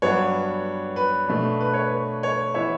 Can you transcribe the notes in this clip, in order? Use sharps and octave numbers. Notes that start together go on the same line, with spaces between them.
G2 F#3 B3 D4 C#5
B4
B2 A3 D4
B4
C#5
B4
C#5
E3 B3 C#5 E5